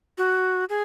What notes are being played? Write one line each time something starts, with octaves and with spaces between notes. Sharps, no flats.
F#4
G#4